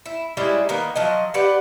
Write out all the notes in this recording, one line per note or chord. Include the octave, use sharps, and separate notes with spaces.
E4
G3 G#3 C#4 E4
D#3 A#3 B3
F3 F#3 D#5
G4 B4 D5 F#5